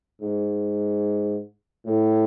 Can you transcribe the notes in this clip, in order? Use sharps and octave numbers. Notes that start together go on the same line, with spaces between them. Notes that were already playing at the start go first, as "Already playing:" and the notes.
G#2
A2